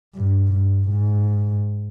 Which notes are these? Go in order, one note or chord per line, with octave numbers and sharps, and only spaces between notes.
G2
G2
G#2